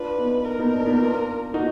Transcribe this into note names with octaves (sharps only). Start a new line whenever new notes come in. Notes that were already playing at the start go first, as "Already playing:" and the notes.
Already playing: D4 F4 B4
B3 D#4
A#4
B3 D#4
D4
B3 D#4
D4 F4
D#4 F#4